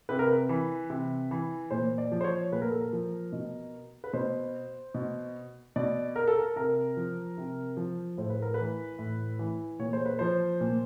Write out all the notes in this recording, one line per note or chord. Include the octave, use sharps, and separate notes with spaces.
C3 B4
A#4
B4
E3
C3
E3
A#2 C5
D5
F3
C5
C#5
A#2 B4
A#4
A4
A#4
F3
B2
B4
B2 C5
B2
B2 D5
A#4
A4
A#4
C3 A#4
F3
C3
F3
A2 C5
B4
A#4
E3 B4
A2
E3
A#2 C#5
C5
B4
F3 C5
A#2